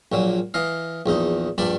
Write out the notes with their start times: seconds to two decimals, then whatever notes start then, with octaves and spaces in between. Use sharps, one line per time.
0.12 A#1 A#2 F#3
0.54 E3 D#5 F5
1.06 A#1 E2 D#4
1.58 A#1 G2 D4 D5 B5